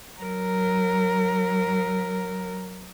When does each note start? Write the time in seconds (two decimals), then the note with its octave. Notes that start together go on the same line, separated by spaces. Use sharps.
0.20 F#3 A#4